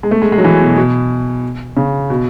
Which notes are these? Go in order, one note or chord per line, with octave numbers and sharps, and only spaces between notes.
G#3
A3
G#3
G#3
F#3
E3
B2
B2
C#3
B2